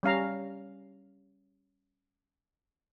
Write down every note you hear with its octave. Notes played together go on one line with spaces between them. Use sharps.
G3 C#4 F5 A#5